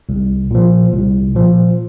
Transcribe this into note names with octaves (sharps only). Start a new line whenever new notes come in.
C2
A#2 F3
C2
A#2 F3